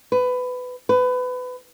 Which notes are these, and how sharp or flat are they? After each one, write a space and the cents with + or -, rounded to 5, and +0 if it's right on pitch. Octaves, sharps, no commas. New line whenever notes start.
B4 +20
B4 +25